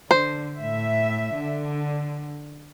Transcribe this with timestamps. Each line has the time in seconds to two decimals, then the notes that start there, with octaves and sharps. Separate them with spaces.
0.11 D3 C5
0.57 A2 E5
1.37 D3